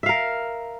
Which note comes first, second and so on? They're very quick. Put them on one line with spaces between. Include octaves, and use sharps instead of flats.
E5 F5 A#4